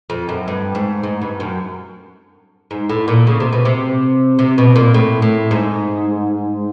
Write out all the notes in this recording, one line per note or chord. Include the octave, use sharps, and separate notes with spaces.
F2
F#2
G2
G#2
G#2
G2
F#2
G#2
A2
A#2
C#3
C3
B2
C3
C3
B2
A#2
A2
A2
G#2